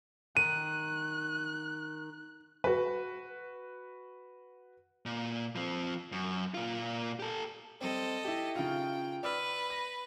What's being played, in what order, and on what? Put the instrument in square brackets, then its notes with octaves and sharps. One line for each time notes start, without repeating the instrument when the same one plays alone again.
[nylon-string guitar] D#3 [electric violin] F#6 [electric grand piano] D#7
[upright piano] F#4 B4
[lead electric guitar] A#2
F3 C4
F#2
A#2 F4
G4 A4
[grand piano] G3 C4 [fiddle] A4 D#5
[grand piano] E4 G4
[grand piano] C#3 D#4 F4 [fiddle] G5
[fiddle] B4 [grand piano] D5 E6 F6
[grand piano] A#6